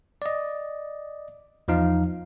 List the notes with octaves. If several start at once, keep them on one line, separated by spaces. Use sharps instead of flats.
D5 D#5
E2 F3 D#4 F5